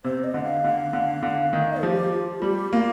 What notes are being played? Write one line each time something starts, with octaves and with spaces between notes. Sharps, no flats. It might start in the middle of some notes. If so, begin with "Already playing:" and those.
C3 C5
D#5
D3
F5
D3
D3
D3
D#3
F3 G4
F4
G3 G4
A#3 F4